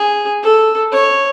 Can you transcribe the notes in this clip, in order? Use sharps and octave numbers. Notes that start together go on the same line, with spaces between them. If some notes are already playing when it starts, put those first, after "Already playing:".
Already playing: G#4
A4
C#5